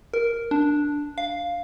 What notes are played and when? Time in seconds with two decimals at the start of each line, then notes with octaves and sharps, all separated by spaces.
0.14 A#4
0.51 D4
1.18 F5